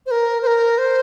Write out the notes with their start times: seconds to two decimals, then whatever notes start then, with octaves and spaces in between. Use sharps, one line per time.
0.06 C5
0.11 A#4
0.42 C5
0.47 A#4
0.78 C5